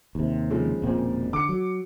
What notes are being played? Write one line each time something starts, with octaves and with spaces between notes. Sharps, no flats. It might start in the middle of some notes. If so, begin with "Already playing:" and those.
D#2 C3
C#3 F3 G#3
E1 A#2 C4
D3 D6 C#7
F#3